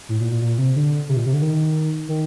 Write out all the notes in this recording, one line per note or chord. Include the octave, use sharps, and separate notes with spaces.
A2
A#2
A#2
A#2
C3
D3
C3
A#2
C3
D3
D#3
D#3